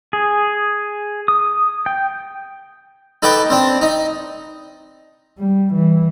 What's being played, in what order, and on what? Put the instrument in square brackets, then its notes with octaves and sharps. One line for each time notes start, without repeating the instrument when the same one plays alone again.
[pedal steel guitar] G#4
D#6
G5
[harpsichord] D#4 A4 B4 G5 D6
C4 D4
D#4
[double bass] G3
E3